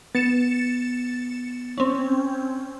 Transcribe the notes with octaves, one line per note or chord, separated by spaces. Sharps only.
B3 A6 C#7 E7
C4 C#4